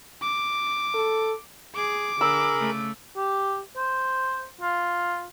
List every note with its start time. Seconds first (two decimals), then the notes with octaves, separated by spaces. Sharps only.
0.22 D6
0.95 A4
1.76 G#4 D6
2.21 D3 G#4 A#4 B5 E6
2.58 C#3 A3
3.16 G4
3.76 C5
4.61 F4